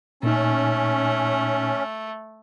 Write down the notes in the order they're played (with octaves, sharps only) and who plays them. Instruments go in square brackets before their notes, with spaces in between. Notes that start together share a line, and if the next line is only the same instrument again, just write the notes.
[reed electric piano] A#2 D#4 [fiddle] A3 [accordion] C#4